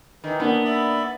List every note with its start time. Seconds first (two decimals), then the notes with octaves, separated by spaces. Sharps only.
0.24 D#3 E3
0.40 A#3 B3 D4
0.65 D5 E5 B5